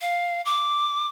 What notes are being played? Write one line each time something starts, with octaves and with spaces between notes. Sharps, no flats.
F5
D6